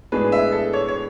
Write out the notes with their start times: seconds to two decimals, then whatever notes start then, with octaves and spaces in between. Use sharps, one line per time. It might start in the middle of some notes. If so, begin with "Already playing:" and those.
0.12 A2 G#3 B3 D4 G#4 B4
0.32 E5
0.52 A4
0.73 C#5
0.88 C#5